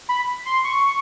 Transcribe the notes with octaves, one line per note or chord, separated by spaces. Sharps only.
B5
C6
C#6